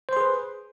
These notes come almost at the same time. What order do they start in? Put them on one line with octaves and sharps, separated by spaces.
C5 C6 G#4 B4